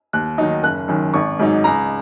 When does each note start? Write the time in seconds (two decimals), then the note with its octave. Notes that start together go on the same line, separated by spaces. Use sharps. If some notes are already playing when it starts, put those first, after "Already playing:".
0.13 D#2 F#6
0.38 D#3 F#3 D#4
0.63 F#1 F#6
0.88 F#2 D#3
1.14 G#1 C#6
1.39 G#2 F#3 D#4
1.64 C#2 A#5